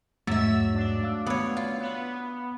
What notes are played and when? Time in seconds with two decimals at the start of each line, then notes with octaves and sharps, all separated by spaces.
0.27 E2 G#2 F#3 G#3 A3 E5 E6
0.74 D4
1.03 F5 D6 E6
1.26 B3 C#5
1.57 F4
1.78 B3